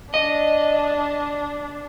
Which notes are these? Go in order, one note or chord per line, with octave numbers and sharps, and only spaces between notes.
D4 D#5